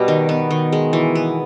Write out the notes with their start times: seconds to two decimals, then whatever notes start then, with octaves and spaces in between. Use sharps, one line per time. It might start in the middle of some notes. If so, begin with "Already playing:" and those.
Already playing: B2 G3 B3
0.08 D#3
0.29 B3
0.51 D#3
0.72 G#3
0.93 E3
1.15 B3